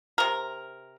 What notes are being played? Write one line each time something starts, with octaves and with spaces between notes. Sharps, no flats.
C3 A#4